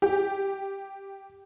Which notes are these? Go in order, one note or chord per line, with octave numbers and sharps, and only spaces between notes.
G4